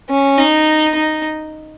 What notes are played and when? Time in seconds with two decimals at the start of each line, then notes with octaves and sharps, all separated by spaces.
0.10 C#4
0.38 D#4
0.95 D#4